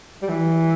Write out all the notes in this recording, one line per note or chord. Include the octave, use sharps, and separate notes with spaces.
G3
E3